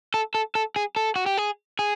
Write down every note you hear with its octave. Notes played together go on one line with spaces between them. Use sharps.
A4
A4
A4
G#4
A4
F#4
G4
G#4
G#4